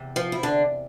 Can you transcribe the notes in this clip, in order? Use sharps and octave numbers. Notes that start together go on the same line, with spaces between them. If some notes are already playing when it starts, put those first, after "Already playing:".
Already playing: E2 C3
F3 F4
E4
D3 D4